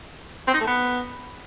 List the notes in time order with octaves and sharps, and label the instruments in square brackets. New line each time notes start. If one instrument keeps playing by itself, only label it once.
[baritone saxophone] C4
D#4
A3
B3